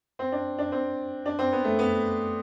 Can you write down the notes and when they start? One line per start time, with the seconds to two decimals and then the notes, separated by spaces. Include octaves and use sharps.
0.19 C4
0.32 D4
0.58 D4
0.72 C4
1.26 D4
1.39 C4
1.52 B3
1.65 A3
1.79 B3